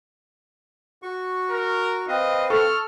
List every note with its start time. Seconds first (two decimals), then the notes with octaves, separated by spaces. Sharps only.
1.02 F#4 C#6
1.50 A#4
2.08 C4 B4 D#5 F5
2.50 A4 C#6 F6